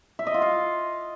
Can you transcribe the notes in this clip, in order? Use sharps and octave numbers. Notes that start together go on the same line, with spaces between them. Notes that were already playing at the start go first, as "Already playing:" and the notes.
E5
D#5
F4
F5